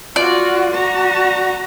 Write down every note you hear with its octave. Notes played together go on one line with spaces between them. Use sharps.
F4 F#4 D5
F#4 A#5